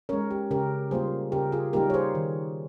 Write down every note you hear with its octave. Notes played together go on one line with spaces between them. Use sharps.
G#3 C#4 A#4 C#5
G4
C#3 G4 A#4
G3 A#3 F4 G#4 C5
C#3 G4 A#4
F4 G#4
G3 A#3 D#4 G4 A#4
C#5
G#4 C5
D#3